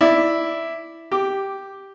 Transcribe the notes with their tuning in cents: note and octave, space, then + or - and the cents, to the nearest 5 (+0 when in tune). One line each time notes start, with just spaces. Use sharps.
E4 +0 D5 +0
G4 -5 D6 +10